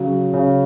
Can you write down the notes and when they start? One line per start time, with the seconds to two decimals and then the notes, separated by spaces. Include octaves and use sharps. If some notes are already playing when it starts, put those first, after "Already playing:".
Already playing: C#3 F#3
0.33 C#3